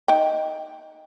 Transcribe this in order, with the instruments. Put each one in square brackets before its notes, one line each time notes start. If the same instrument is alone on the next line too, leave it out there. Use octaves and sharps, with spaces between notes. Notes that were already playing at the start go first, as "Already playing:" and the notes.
[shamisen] D#4 G5